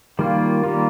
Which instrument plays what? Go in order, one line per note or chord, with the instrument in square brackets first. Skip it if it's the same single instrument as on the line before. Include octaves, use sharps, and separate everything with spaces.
[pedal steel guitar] D#3 G3 A#3 F4
D#3 G3 A#3 F4